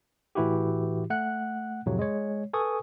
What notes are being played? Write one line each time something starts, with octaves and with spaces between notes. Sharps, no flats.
A2 E3 E4 F#4 G4
A3 F#5 F#6
F2 A2 C3 F#3
G#3 C#5
A4 B4 G#5 C#6 D#6